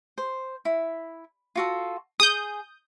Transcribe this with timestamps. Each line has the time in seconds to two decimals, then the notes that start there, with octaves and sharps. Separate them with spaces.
0.18 C5
0.65 E4
1.56 F4 F#4 A4
2.20 G#4 D#6 G6